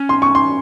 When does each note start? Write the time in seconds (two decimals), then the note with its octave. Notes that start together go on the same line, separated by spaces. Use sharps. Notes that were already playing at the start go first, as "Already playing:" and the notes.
Already playing: C#4
0.09 C6
0.22 C#6
0.35 C6